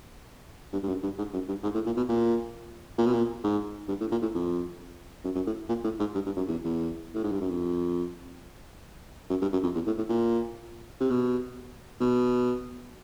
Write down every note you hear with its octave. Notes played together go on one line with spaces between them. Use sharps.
G2
G2
F#2
G2
G#2
F#2
G2
G#2
A2
A#2
B2
A#2
A#2
B2
A#2
G#2
G2
A2
A#2
A2
F2
F#2
F#2
A2
A#2
A2
G#2
G2
G2
F#2
E2
E2
A2
G#2
G2
F#2
F2
F#2
G2
F#2
F2
E2
A2
A2
A#2
C3
B2
B2